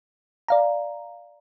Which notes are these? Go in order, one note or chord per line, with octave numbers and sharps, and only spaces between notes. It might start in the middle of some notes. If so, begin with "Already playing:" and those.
D5 F5 A#5